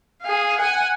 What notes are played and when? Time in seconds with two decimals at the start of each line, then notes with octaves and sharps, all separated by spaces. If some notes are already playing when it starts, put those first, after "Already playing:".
0.22 G#4 F5
0.58 F#5 G#5